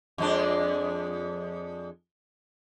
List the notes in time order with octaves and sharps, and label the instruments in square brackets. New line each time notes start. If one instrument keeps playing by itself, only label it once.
[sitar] F2 G#3 D4